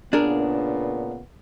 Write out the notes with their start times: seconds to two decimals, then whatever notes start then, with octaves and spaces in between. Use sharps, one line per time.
0.13 A#2 C#3 B3 D4 G#4 A#4